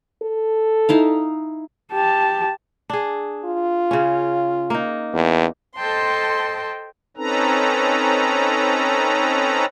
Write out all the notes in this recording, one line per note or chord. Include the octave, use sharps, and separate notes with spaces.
A4
D#4 E4 F5
G4 A5
D4 G#4
F4
C#3 C#4
A#3 D#4
E2
A4 C5 D#5 G5 A5 C6
C4 C#4 D#4 A4 B4 A#5